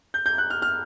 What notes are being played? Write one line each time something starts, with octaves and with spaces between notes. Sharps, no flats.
G6
G6
F#6
F6
F6